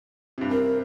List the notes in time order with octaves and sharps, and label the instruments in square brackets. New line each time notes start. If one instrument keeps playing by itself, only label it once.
[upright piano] G2 C3
[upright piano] C4 [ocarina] A#4